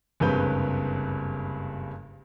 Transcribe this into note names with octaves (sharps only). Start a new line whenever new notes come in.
F#1 C#2 G2 C3 B4 G6